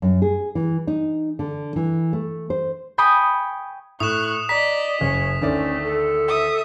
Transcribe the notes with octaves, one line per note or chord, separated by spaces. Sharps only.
F#2
G#4
E3
D#4
D3
E3
A3
C5
G5 G#5 B5 C#6 D#6
A2 C#6 D#6 F#6 E7
D5 D#5 A#5 B6
F#1 C#4
D2 D#3 A3 C#4 D5
A4
E5 D#6